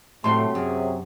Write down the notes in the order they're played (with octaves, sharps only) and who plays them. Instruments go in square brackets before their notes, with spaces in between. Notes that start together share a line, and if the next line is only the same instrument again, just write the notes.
[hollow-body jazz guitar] A2 G3 [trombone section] C3 F#3 [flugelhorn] A3 [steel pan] C6
[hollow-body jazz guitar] F#2 [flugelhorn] G#4